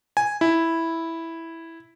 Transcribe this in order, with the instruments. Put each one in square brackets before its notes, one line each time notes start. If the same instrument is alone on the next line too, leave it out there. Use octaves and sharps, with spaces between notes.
[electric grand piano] G#5
E4